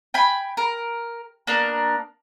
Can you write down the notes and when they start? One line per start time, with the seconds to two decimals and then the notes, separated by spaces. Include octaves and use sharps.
0.14 G5 G#5 B5
0.57 A#4
1.47 A#3 B3 D4 A#4